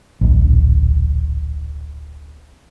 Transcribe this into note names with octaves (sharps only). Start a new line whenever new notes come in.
D1 A#1